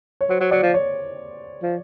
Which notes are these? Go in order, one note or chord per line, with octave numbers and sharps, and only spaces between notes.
C#5
F#3 C5
F#3
F#3 D5
F3
C#5
F3